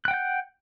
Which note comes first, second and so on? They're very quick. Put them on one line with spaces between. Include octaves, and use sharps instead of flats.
F#6 G5 F#5 G6